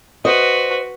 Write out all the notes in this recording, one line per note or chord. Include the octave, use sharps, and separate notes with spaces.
F#4 B4 C5 D#5